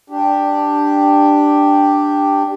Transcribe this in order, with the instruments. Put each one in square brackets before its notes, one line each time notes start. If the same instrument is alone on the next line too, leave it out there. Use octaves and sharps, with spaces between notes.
[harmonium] D4 G4